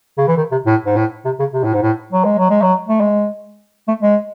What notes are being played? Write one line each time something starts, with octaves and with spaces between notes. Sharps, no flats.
C#3
E3
D#3
C3
A2
G#2
A2
C3
C#3
C3
A2
G#2
A2
F#3
G#3
F#3
G#3
F#3
A3
G#3
A3
G#3